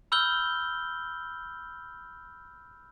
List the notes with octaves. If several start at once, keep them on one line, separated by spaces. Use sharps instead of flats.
B5 E6 F6 G6 G7